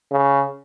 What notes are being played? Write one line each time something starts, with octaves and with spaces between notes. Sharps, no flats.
C#3